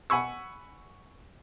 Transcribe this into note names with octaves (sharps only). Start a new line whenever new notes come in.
F#5 G#5 B5 C#6 E6